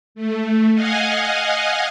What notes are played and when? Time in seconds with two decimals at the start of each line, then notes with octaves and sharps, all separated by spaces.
0.15 A3
0.74 D#5 F5 F#5 G#5